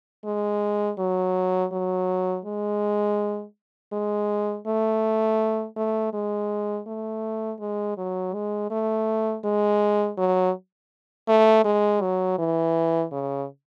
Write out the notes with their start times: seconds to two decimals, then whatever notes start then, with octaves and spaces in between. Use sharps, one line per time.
0.25 G#3
0.99 F#3
1.72 F#3
2.45 G#3
3.92 G#3
4.66 A3
5.76 A3
6.13 G#3
6.87 A3
7.60 G#3
7.97 F#3
8.34 G#3
8.71 A3
9.44 G#3
10.17 F#3
11.28 A3
11.65 G#3
12.01 F#3
12.38 E3
13.12 C#3